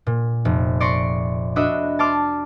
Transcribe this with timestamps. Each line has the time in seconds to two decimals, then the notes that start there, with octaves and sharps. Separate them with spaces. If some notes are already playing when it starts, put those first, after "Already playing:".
0.07 A#2
0.45 F1
0.80 D5 C6 C#6 A#6 D7
1.56 D4 F#4 D#5 E5 B5
1.99 A5 C6 D6 F6